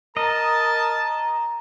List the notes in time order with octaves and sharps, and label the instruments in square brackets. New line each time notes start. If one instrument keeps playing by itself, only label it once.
[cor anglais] A#4 [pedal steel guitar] D#5 [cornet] A5 [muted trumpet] A#5